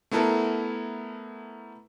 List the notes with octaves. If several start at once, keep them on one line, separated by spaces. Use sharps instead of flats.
A3 B3 E4 A4 A#4